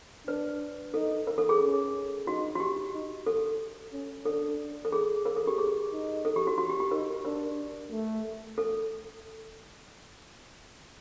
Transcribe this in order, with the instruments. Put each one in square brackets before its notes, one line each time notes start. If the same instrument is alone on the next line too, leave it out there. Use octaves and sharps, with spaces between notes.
[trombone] D4 [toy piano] B4
[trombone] D#4 [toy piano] A4
[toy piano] A#4
A4
G#4
[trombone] C#4
[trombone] D#4 [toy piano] F#4
[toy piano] F#4
G4
[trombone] D#4
[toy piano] A4
[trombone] C#4
[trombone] D4 [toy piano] A4
[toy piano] A4
G#4
A#4
A4
G4
G#4
[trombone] D#4
[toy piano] A4
G4
F#4
F#4
G4
G4
[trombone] D#4 [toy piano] A#4
[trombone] D4 [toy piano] A#4
[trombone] A3
[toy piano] A4